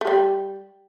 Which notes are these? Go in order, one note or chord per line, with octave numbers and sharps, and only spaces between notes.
A3
G3